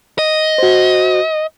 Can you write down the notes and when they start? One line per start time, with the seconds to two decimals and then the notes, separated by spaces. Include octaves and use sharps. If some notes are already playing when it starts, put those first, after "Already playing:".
0.19 D#5
0.58 F#4 C5